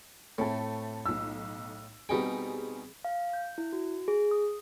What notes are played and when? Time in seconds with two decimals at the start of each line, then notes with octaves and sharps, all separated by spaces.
0.38 A2 A3 C4 A4
1.06 B1 E6
2.09 B2 G3 C4 D#4 G#4 G5
3.05 F5
3.33 G6
3.58 E4
3.73 F#4
4.08 G#4
4.31 D#6